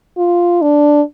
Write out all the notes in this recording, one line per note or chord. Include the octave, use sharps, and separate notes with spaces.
F4
D4